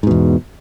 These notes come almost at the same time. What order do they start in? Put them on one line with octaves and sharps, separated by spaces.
G#2 B2 E2